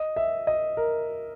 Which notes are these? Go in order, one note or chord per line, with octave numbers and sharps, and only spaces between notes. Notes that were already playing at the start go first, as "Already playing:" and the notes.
Already playing: D#5
E5
D#5
A#4